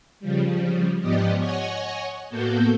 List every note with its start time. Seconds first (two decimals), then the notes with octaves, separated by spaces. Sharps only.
0.20 C#3 F3 G3
1.00 G#2 F3 B3 G4 D5 D#5
1.39 C#5 D#5 F#5 G#5 C#6
2.29 A2 A#3 B3 F#4 A4 G6